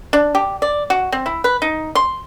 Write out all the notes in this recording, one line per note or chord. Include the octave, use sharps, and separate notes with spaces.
D4
G4
D5
F#4
C4
E4
B4
D#4
C6